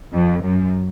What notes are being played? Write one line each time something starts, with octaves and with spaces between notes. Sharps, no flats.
F2
F#2